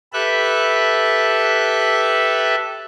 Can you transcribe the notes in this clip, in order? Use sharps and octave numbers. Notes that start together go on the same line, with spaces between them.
G4 A4 B4 E5 F#6